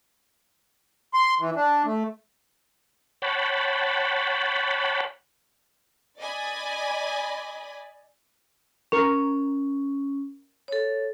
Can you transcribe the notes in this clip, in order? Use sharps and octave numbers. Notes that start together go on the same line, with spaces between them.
C6
E3
D4
A3
C#5 F#5 G5 A5 B5
D5 D#5 G#5 B5
C#4 A#4 C#6
A4 C#5